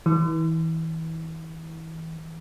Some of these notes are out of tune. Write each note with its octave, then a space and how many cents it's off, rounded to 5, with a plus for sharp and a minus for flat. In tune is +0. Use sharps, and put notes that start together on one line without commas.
E3 -30